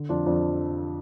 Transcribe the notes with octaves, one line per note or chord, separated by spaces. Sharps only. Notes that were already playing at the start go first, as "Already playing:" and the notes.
Already playing: D3
F2 D4 F4
F2 D4 F4